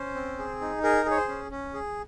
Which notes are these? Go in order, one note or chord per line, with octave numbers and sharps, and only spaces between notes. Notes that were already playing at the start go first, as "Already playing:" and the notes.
Already playing: C#4 C5
C4
G#4
D#4
G#4 A#4
G#4
C#5
C5
C#4
C#4
G#4